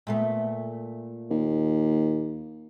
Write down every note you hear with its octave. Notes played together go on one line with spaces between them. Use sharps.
A#2 A3 B3
D#2